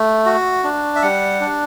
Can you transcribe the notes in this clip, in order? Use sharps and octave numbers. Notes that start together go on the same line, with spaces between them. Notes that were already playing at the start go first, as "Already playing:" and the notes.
Already playing: A3
F#4
D4
E5
G3 F#5
D4